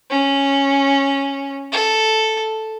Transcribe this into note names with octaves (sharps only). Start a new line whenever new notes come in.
C#4
A4